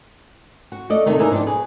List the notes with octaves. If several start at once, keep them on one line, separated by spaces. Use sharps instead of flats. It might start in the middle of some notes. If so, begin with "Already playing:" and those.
F#4
A3 D5 D#5
C3 D#3 A3
D#4 E4 G#4 A#4 B4 D5
F3 D4 D#4 F#4 G4
B2 G#4 B4